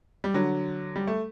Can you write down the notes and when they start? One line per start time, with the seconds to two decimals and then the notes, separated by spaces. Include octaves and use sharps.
0.24 G3
0.34 D3 F#3
0.96 G3
1.07 A3